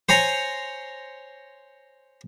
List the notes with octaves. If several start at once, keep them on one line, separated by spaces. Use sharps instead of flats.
C5 C#5 G#5 A#5